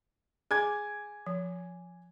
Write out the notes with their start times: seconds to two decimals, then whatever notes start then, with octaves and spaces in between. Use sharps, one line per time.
0.51 G#4 G#5 D6 G#6
1.27 F3